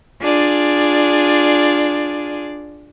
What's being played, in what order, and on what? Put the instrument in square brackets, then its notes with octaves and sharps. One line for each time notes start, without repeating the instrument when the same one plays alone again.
[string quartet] D4 F4 G#4 D5